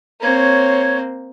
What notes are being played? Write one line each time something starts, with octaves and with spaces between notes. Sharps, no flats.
A#3 C4 C#5